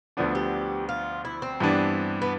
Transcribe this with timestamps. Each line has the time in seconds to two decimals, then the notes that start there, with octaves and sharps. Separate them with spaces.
0.17 D2 D3 F3 B3 D4
0.35 G4
0.89 F4
1.25 E4
1.42 C4
1.60 G2 E3 B3 D4
2.22 B3